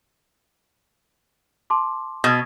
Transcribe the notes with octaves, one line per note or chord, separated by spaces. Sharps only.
A5 C6 D6
B2 D#6 G#6